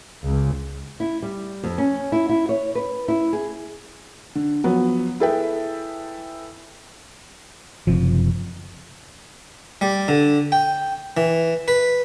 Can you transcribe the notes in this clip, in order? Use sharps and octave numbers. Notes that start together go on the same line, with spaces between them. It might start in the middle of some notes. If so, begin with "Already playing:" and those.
C#2
E4
G3
F2
C#4
E4
E4
C#5
B4
E4
G#4
D3
F3 F#3 B3 F#4
E4 G#4 A4 B4 E5 G5
F#1 C3 F3
G3
D3
G5
E3
B4